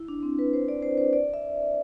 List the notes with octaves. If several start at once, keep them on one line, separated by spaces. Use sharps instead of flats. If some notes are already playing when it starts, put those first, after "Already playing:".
Already playing: E4
D4
C4
B4
C5
D5
C5
C5
D5
E5